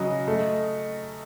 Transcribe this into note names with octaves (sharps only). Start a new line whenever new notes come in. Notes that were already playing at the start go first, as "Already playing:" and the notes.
Already playing: C#3 F#3 D#5
A3